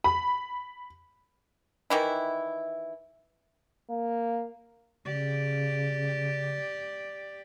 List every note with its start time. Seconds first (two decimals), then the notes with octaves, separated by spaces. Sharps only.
0.04 B5
1.90 D#3 E3 E4
3.90 A#3
5.05 C#3 G4 D5